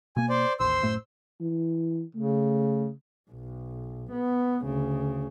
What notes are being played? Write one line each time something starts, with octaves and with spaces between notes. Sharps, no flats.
B2 A#3 G#5
C5 D5
A1 D#2 C5 C6 E6
F#1 A2 A3
E3
C#3 A3
B1
B3
D2 C#3